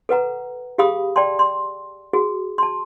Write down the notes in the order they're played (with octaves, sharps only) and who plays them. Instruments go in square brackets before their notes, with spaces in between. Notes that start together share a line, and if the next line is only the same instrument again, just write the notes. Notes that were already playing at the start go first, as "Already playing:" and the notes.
[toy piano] A4 B4 F#5 A#5
G4 G#4 F5 B5 D#6
D5 G5 A5 C6
C6
F#4 G#4
A5 C6